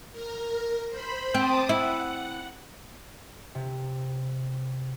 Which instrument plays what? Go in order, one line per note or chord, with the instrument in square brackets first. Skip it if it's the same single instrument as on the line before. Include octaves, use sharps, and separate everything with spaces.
[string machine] A#4
C5 B5
[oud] C4 [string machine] A5 D6 D#6
[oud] E4 [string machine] F#5
[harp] C3